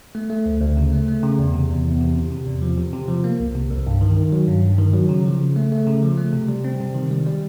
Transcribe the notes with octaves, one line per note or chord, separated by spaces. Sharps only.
A3
A3
D2
D2
C#3
A3
A3
C#3
E2
C3
E2
E2
C3
C3
C3
E2
F3
C3
C3
F3
A#3
C2
C3
C2
G2
D#3
D#3
F#3
G2
G2
D#3
F#3
C#3
F3
C#3
A3
A3
C#3
F3
A3
C3
G3
C4
C3
D#3
G3
G3